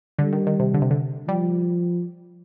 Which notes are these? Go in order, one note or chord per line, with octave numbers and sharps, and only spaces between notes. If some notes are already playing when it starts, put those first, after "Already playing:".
D3 G3
D#3
D#3
C3
D3
C3
D3
F3 G3